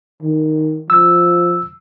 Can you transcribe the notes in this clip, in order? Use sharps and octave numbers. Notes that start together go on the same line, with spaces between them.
D#3
F3 E6